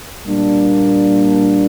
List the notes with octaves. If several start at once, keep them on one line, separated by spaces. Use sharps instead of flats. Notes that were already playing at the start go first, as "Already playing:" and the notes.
A#2 G3 A#3 D4